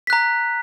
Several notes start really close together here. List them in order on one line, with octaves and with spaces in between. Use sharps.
B6 F#6 A#5